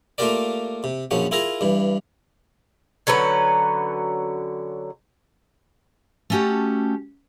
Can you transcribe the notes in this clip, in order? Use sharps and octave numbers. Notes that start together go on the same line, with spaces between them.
A3 A#3 F4 G4 A#4 D5
C3
A#1 F#2 F3 C#4 F#5
E4 F4 G#4 A#4 A#5
G2 E3
D3 F#3 C#4 B4
A3 B3 C#4 F#4 G4 A4